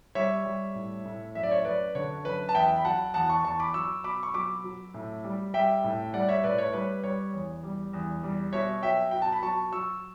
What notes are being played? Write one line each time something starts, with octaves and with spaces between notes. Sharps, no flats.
G3 C#5 E5
G3
A2
A2
F#2 E5
D5
C#5 E5
F#2 B4 D5
D3 C#5
F#2 B4
A5
E2 E5 G5
B5
F#3 F#5 A5
E2 F#5 A5
A5 C#6
E2 A5 C#6
B5 D6
F#3 C#6 E6
B2 B5 D6
C#6
F#3 B5 D6
F#3
A2
G3
G3 E5 G5
A2
G3 D5 F#5
C#5 E5
A2 B4 D5
C#5
G3 B4
G3 C#5
E2
G3
E2
G3
B2 C#5 E5
F#3 E5 G5
B2 G5
A5
B5
F#3 A5 C#6
F#3 C#6 E6